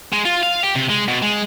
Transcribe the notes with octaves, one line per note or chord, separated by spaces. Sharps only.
G#3
F4
F5
G4
C3
G#3
B2
G#3